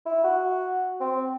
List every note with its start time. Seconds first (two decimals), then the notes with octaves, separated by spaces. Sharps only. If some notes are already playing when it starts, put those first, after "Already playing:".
0.06 E4
0.24 F#4
1.00 C4